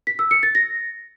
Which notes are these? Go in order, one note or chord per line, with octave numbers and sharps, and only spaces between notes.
B6
E6
C#7
A6
A#6